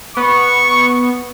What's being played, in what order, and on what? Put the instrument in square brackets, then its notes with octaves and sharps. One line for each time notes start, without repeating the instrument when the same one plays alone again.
[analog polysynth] B3 [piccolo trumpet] C#6